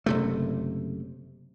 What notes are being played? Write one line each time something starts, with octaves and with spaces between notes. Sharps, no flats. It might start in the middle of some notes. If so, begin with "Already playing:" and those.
F#1 C3 A3